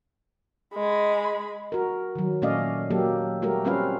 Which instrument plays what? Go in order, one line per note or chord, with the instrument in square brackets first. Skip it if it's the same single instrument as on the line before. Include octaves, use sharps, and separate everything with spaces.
[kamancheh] G#3 B5
[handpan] F#4 A#4
D#3 F#3
A#2 A3 C#4 D5 D#5 F5
F#3 A#3 G4 A4
G3 A3 F#4 G4 A#4
G3 C4 C#4 F4 B4 F5